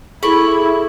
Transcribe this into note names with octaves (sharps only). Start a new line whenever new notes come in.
E4 G#4 A4 B5 C#6